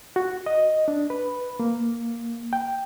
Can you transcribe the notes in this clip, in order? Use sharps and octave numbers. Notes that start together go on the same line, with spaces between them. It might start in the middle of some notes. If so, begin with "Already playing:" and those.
F#4
D#5
D4
B4
A#3
G5